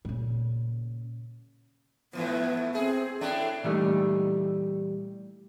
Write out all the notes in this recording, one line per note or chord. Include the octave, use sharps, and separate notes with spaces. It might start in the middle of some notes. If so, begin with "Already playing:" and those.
A#2 C#3
G#2 E3 F3 B3
A3
C4 G#4
A2 A3 D4 G5
A#2 E3 G3 A3 D#4